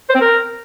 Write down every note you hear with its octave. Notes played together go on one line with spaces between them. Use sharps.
C5
C4
A#4